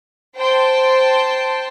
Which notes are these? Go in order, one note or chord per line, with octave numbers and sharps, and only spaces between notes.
C5 G5 A5 C6